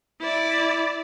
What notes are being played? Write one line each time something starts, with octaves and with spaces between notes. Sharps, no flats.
E4 D5